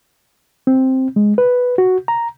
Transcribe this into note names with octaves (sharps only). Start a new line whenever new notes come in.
C4
G#3
B4
F#4
A#5